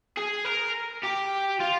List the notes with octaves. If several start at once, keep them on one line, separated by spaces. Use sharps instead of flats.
G#4
A#4
G4
F4